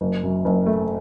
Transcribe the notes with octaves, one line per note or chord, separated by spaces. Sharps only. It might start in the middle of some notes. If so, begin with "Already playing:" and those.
F#1
F#2
F#1
A3